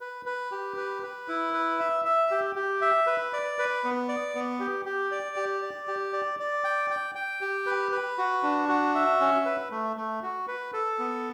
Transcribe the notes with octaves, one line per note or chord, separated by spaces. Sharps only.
B4
B4
G4
B4
B4
E4
B4
E5
E5
G4
G4
E5
B4
D5
B4
B3
D5
B3
G4
G4
D5
G4
D5
G4
D5
D5
G5
G5
G5
G4
B4
B4
F#4
D4
F#4
E5
C#4
B4
A3
A3
F#4
B4
A4
B3